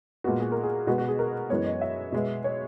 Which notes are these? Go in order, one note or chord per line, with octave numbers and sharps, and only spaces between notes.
A#2 G#3 B3 F#4
G#4
A#4
G#4
B2 G#3 B3 F#4
F#4
G#4
A#4
F#2 E3 G#3 B3 C#5
D#5
E5
B2 G#3 B3
C#5